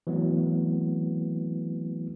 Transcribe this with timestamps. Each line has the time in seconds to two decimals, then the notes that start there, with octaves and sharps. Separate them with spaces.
0.07 E3 F#3 A3 B3 C4